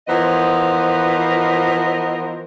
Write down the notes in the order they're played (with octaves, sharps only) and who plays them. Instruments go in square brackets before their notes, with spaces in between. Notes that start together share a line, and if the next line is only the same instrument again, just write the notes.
[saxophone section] E3 F3 B3 A#4 C5 D#5